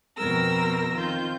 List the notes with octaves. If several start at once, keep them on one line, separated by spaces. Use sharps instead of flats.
F2 B2 C4 A#4 E6 A#6
D#3 C4 F4 G6